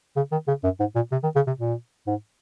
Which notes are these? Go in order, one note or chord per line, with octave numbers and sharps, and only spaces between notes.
C#3
D#3
C#3
F#2
G#2
A#2
C3
D#3
C#3
C3
A#2
G#2